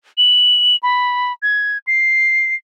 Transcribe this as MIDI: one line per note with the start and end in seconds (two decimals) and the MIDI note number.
0.18 0.76 102
0.83 1.32 83
1.42 1.78 92
1.87 2.55 96